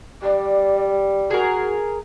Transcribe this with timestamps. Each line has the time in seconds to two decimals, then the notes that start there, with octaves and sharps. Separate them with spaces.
0.22 G3 D5
1.31 F#4 G#4 A#4